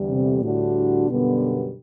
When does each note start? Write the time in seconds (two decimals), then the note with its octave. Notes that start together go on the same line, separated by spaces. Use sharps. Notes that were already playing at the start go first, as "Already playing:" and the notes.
Already playing: E2 D3 G3
0.09 C3
0.42 D2 A2 D3 G3 D4 F#4
1.08 F#2 B2 D3 G3 B3